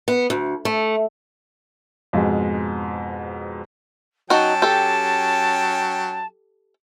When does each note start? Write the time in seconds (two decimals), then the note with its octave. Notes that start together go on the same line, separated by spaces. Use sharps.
0.08 B3
0.30 D2
0.65 A3
2.13 F2 G#2 B2 G#3
4.30 F#3 C#4 D#4 F#4 G5 A5
4.62 G4 A4